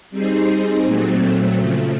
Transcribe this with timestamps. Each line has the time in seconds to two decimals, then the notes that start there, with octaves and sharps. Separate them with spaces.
0.11 G3 C4 D#4 G#4 C5
0.84 A#2 F#3 A3 C4
1.58 C#3 F3 A3